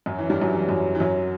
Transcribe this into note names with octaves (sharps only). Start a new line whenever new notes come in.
F#2 F#3
E3
G2 G3
F#2 F#3
E3
F#2 F#3
E3
F#2 F#3